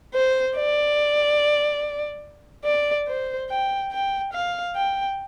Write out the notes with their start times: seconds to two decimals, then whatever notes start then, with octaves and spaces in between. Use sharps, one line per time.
0.14 C5
0.56 D5
2.65 D5
3.08 C5
3.50 G5
3.92 G5
4.33 F5
4.75 G5